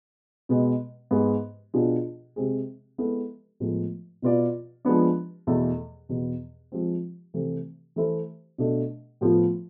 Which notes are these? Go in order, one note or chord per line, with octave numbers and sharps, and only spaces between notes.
B2 G#3 B3
G#2 G#3 B3
B2 B3 D4 F4 G#4
C3 G#3 C4 G#4
G#3 B3 E4 A4
A2 F3 G#3 B3
B2 B3 F4 B4 D5
F3 G#3 B3 D4
E2 B2 A3 E4 A4
E2 B2 B3
F3 G#3 C4
C3 E3 A3 C4
E3 A3 E4 A4 C5
B2 A3 D4
A2 F3 B3 F4